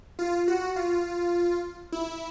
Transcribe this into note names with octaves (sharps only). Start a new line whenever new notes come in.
F4
F#4
F4
E4